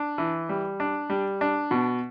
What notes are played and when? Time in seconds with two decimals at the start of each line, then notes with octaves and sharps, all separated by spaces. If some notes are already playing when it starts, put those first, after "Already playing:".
Already playing: D4
0.18 E3
0.49 G3
0.80 D4
1.10 G3
1.41 D4
1.71 B2